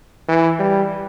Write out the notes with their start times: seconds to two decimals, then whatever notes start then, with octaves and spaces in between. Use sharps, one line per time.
0.29 E3
0.60 G3